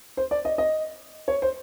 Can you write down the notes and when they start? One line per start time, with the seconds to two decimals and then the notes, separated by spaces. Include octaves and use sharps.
0.17 C5
0.31 D5
0.45 D#5
0.58 D#5
1.28 C#5
1.42 C5